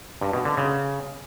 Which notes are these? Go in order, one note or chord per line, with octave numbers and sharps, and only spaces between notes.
G2
B2
D3
C#3